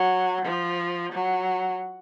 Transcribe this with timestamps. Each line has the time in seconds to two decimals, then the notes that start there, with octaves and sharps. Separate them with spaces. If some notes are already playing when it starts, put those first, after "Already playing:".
Already playing: F#3
0.45 F3
1.13 F#3